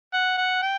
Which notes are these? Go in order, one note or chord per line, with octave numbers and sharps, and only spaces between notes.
F#5
F#5
G5